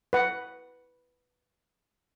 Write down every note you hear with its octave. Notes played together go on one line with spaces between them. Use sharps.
B4 F#5